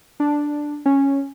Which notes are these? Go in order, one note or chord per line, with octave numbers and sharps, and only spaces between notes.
D4
C#4